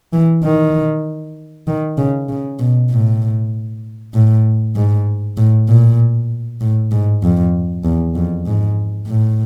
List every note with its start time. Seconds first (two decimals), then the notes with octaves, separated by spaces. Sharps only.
0.13 E3
0.44 D#3
1.68 D#3
1.98 C#3
2.29 C#3
2.59 B2
2.91 A2
4.14 A2
4.76 G#2
5.37 A2
5.68 A#2
6.61 A2
6.92 G#2
7.23 F2
7.84 E2
8.15 F2
8.46 G#2
9.07 A2